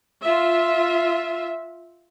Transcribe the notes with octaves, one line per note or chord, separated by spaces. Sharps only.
F4 E5